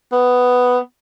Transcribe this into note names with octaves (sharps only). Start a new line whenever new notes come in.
B3